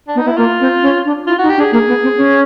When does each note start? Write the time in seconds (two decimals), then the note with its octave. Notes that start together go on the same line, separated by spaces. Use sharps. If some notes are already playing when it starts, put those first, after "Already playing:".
0.08 D4
0.15 B3 D#4
0.25 B3 E4
0.37 A#3 F4
0.60 C4
0.82 C#4
1.05 D4
1.27 E4 F4
1.39 F#4
1.42 D#4
1.50 G4
1.57 D4
1.61 G#4
1.72 A#3 G#4
1.88 B3
2.03 C4
2.17 C#4